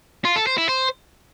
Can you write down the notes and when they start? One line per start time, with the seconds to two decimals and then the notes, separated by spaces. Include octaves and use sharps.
0.25 F4
0.36 A4
0.47 C5
0.58 E4
0.69 C5